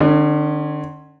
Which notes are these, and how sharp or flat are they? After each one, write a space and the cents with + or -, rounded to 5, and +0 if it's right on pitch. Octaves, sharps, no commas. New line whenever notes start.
D3 +40 C#4 +0